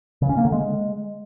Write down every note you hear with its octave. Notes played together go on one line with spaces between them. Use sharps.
C#3
C#4
A#3
D3
G#3